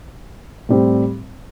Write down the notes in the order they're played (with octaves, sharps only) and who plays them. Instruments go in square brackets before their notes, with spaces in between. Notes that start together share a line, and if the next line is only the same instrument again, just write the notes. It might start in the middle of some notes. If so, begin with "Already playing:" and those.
[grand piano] A2 G3 C4